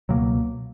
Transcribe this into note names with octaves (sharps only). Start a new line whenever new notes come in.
C#2 B2 F#3 A#3